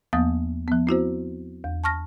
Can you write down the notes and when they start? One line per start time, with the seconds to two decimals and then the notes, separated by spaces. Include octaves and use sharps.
0.13 E2 F3 A#3 B3 D#6 A6
0.68 F3 B3
0.87 C4 E4 F#4 C5
1.64 E2
1.84 A5 C#6 F6 A#6